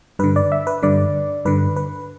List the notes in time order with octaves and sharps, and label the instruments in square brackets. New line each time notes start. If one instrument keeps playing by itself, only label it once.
[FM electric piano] G2 D3 B4
D5
E5
B4
G2 D3 D5
G2 D3 B4
B4